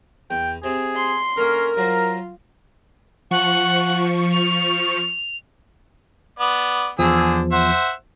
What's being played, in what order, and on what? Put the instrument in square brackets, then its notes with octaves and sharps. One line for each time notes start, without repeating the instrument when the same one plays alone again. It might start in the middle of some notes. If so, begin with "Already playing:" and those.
[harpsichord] E2 [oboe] G5
[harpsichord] C3 C4 [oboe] G#4
[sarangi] C6
[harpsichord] D3 A#3 [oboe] C#4 [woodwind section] A#4
[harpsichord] F#3 F#4 C5 [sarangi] F4 [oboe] A#5
[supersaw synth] F3 C#6 [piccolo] F#5
[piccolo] F7
[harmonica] B3 D5
[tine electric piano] E2 F3 [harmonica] D3 G#4 E6
[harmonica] C5 E5 F#5